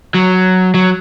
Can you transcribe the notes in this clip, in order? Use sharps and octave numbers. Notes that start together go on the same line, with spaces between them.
F#3
F#3